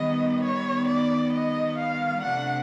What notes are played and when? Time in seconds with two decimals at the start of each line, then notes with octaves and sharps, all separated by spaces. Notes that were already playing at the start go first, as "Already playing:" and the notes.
Already playing: D#3 G3 B3 D#5
0.43 C#5
0.88 D5
1.33 D#5
1.78 F5
2.22 C3 F3 A3 D4 F#5